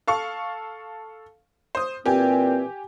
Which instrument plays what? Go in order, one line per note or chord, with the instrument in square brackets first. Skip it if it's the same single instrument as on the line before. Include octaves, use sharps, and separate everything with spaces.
[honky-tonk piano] A4 F5 C#6
C5 D#6
[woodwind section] A#2 E3 C4 [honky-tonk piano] G4 G#5